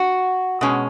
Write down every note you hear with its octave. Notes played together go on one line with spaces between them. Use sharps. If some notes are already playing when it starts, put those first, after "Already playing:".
Already playing: F#4
B2 G#3 C#4